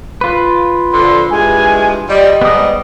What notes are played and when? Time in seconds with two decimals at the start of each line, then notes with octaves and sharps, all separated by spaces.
0.21 F4 B4
0.93 D3 F3 C6
1.31 G2 E3 G#3 G#5
2.09 G3 D#5
2.41 G#2 G3 B3 D#6